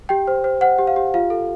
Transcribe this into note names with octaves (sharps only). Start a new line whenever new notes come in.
G4 G5
C5
C5
C5 F#5
G4
F5
G4
F4 F5
A4